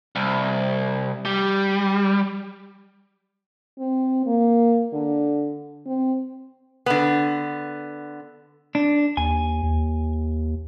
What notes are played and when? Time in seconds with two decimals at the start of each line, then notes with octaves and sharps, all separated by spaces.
0.16 C2
1.25 G3
3.79 C4
4.26 A#3
4.93 D3
5.86 C4
6.86 D3 B3
8.75 D4
9.17 D#2 G#5
9.63 D#2